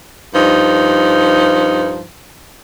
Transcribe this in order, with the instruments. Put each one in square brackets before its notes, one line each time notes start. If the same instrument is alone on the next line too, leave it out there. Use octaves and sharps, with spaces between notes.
[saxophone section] G2 F3 D#4